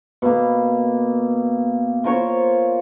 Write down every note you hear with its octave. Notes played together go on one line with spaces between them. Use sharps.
B2 A#3
F4 A#4 C5 C#5